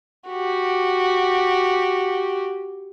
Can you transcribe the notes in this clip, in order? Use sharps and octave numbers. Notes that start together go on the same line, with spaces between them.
F#4 G4